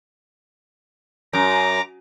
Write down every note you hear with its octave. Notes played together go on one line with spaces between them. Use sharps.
F#2 A#5 D6